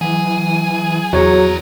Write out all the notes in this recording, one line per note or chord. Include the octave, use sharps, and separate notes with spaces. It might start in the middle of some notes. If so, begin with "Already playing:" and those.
E3 F#3 G#4
E2 F#3 G3 F#4 G#4 A#4 C#5